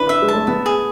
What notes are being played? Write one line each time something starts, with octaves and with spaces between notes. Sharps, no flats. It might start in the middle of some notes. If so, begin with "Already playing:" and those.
Already playing: D4 E4 B4
E5
G#3
A5
A3
B3 E5
G#4